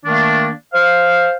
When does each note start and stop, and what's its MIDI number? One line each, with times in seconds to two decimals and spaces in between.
0.05 0.49 51
0.05 0.49 57
0.05 0.49 58
0.05 0.49 62
0.73 1.35 72
0.73 1.35 77